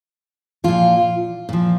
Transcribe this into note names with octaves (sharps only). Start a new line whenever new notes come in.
A#2 F3 F4
A#2 F3